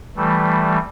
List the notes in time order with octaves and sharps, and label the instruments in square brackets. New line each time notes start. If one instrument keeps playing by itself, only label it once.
[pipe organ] E3 G3 A3